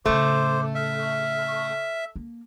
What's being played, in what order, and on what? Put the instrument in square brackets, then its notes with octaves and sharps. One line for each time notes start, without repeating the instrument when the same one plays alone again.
[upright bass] A2 C#3 [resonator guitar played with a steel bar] A3 [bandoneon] C5 [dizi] D6
[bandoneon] E5 [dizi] F6
[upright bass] A#3